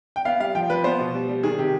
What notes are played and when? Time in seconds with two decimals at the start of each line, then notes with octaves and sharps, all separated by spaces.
0.16 G5
0.25 B3 F5
0.40 G3 F5
0.55 F3 G5
0.70 F3 B4
0.84 B3 C5
1.00 B2
1.14 G3
1.29 G3
1.43 D#3 G#4
1.58 C3 G4